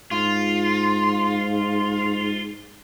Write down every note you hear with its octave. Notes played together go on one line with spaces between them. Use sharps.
G#2 F4